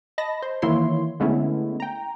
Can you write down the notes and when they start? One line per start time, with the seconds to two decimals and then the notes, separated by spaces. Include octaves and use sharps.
0.18 D#5 A5 B5 A#6
0.42 C5
0.62 D#3 E3 A#3 E4 C#5 C6
1.20 D3 G#3 A3 B3 C#4 E4
1.80 G5 A#5